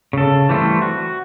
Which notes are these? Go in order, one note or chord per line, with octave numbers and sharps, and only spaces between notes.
C#3 A4
E3 G3 A3 A#3 C4
F#4